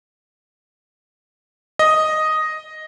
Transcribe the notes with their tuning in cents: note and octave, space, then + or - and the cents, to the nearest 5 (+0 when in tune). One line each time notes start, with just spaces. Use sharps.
D#5 +0